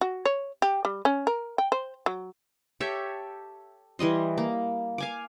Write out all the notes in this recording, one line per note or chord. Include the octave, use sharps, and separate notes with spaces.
F#4
C#5
G4
G3
C#4
A#4
G5
C5
F#3
G4 A4 C#5 E5
E3 G3 D#5 C6
A#3
F5 G#5 D6